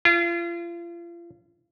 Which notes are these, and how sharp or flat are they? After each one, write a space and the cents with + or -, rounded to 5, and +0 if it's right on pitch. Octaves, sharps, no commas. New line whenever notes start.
F4 -35